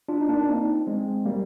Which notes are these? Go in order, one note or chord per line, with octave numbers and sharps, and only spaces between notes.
D4 F4
D#4
A#3 D4
D4
C4 D#4
G#3 C4
G3 A#3